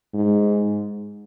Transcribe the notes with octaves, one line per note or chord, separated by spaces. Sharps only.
G#2